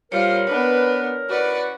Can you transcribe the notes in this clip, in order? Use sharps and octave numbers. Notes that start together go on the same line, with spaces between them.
A#2 G3 F4 A#4 C5 C#5
B3 C4 D4 B4
E3 C#4 F#4 B4 D5